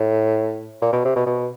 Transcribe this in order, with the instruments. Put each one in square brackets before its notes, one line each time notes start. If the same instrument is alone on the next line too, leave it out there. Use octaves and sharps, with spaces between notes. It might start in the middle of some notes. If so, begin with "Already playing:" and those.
Already playing: [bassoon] A2
A#2
B2
C3
B2
B2